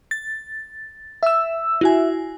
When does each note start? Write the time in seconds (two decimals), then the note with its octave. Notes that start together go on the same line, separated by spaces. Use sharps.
0.11 A6
1.23 E5 E6
1.81 E4 F#4 G#5